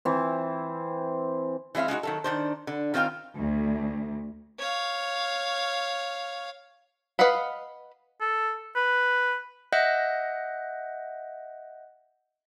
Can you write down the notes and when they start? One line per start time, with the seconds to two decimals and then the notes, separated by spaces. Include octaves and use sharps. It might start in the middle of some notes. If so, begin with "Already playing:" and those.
0.05 E3 C4
1.75 E3 G#3 C4 E5 F5
1.88 G#3 D#4 E4 F#4
2.03 D#3 F#3 A4
2.24 D#3 D4 C5
2.67 D3
2.94 D#3 C4 F4 F5 G5
3.38 D2
4.59 C#5 F5
7.19 B4 D#5 F5 F#5 B5
8.21 A4
8.76 B4
9.73 D#5 E5 F#5 F#6 G6 A#6